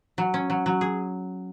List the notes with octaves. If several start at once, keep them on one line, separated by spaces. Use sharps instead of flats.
F#3
C#4
F#3
F#3
G#4